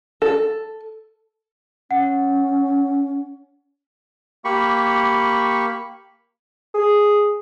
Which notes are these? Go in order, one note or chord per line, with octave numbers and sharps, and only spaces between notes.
A4
C#4 F#5
A#3 G4 B5 C#6
G#4